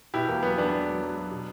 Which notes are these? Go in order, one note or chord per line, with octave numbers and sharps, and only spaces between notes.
B2 E4 G4
E2 A#3
F#3 B3
E2 B3 D4
E2
F#3
F#3
F#3
B2